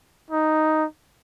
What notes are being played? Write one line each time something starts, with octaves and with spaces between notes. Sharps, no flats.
D#4